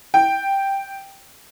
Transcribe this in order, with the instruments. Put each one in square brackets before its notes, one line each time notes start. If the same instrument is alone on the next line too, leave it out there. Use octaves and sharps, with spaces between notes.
[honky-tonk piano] G5